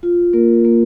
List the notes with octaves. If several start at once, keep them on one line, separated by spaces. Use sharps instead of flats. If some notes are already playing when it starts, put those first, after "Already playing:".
F4
A#3 A#4
A#3